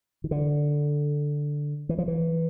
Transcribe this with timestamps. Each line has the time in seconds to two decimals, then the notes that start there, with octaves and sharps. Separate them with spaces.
0.24 D#3
0.31 D3
1.89 E3
1.98 F3
2.08 E3